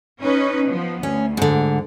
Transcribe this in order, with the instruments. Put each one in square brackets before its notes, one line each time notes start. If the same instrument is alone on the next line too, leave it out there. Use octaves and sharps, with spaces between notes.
[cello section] C#4 D#4 B4
F3 B3
[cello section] D2 [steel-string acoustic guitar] C#4
[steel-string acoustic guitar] G#2 D3